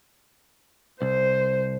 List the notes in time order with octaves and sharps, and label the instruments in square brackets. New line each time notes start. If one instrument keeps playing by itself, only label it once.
[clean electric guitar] C2 [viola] C5